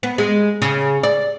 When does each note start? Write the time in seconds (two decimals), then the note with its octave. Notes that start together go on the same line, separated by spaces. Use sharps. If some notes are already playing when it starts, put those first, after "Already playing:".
0.03 B3
0.18 G#3
0.62 C#3
1.03 D5